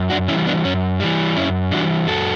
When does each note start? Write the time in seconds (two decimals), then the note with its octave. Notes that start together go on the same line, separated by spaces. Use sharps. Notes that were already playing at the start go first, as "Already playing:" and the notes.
Already playing: F#2
0.10 D4 F#4
0.28 E3 C#4 E4
0.33 G3
0.46 B3 D4
0.65 F#2 C#4
1.00 E3 G3
1.36 F#2 C#4 E4
1.71 E3 G3 D4 F#4
2.07 F#2 F#4 A4